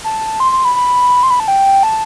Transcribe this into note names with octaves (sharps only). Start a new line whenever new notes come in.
A5
C6
C6
B5
B5
C6
B5
A5
G5
A5